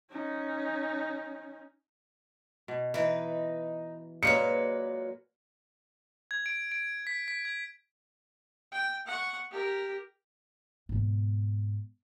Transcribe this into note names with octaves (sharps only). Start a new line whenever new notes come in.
C#4 D#4
B2
E3 D#4 B4
A#2 F#3 G#3 A#3 B4 C#7
G#6
D7
D7
B6
B6
G#6
G5
F#5 C#6
G4 A#4
G#2 B2